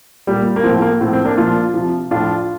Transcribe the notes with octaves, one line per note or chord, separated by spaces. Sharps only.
A#2 G3
A#3
A2 F3 C4
A#3
A2 F3 C4
C4
A#3 D4
A#2 F3 D4 F4
C3 F3
A2 F3 D4 F4